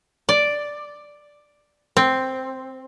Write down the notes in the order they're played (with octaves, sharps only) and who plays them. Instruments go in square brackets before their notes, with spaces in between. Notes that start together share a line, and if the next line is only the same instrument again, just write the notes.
[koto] D5
C4